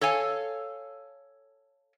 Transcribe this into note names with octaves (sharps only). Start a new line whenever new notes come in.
A4 C#5 F5 G#5